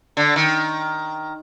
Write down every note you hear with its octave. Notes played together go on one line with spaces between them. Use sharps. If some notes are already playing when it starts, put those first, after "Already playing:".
D3
D#3